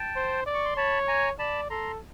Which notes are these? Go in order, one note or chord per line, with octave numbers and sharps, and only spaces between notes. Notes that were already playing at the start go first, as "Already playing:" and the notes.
Already playing: G5 A5
C5
D5
C#6
C6
C#5 A5 B5
G#5 A#5
D5 A5 B5
A4 A#5 C6